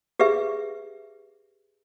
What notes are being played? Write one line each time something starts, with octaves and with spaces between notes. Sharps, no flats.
G4 G#4 B4 E5